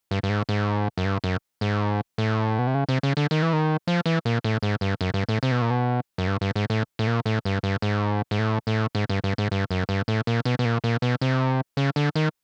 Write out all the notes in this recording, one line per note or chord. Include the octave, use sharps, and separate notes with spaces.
G2
G2
G#2
G#2
F#2
G2
F#2
G#2
A2
B2
C3
C#3
C3
C#3
D3
D#3
E3
D#3
F3
E3
A#2
A2
G#2
G2
F#2
G2
A2
C3
B2
A#2
B2
F#2
G2
G2
G#2
A2
A2
A#2
A2
G2
G2
G#2
G#2
A2
A2
G#2
G2
G2
G#2
G2
F#2
G2
A2
A#2
B2
B2
A#2
A#2
B2
C3
C#3
D3
D#3